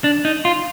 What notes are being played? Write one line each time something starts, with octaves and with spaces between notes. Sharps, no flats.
D4
D#4
F4